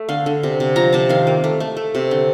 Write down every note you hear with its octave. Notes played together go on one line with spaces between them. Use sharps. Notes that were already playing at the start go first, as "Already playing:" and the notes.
Already playing: A3
D3 F5
D3
C3
C3
F3 A#5
C3 A5
D#3 F5
A#3
A3
A3
A3
C3
D3